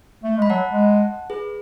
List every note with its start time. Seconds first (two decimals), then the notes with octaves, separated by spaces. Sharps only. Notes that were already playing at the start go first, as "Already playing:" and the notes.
0.23 A3
0.37 G#3
0.42 B5
0.49 F#3 F#5 A5
0.71 G#3
1.30 G#4 B4